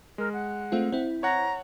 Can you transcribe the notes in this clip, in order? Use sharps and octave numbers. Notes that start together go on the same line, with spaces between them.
G#3 A#4
F#5
A3 C4 F4
C4 E4
C#5 F#5 A#5